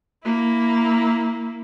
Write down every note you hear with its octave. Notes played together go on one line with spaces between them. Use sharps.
A#3 E4